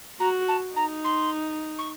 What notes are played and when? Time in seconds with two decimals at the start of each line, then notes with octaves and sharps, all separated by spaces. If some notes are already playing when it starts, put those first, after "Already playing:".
0.19 F#4 A#5
0.48 A5
0.76 D#4 A#5
1.04 C6
1.78 C#6